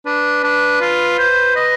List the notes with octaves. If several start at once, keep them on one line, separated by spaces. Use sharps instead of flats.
D4 B4
D4
F4
C5
D#5